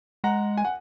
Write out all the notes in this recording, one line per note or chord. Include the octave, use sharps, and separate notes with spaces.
G#3 F#5 A#5
G#5
F#5